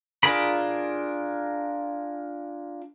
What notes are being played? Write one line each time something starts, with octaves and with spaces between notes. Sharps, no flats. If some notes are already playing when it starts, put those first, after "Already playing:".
D4 F4 G#4 A#4 B5